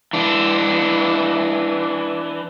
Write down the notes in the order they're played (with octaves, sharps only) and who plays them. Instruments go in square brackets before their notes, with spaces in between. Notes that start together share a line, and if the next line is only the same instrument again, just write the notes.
[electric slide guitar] E3 D4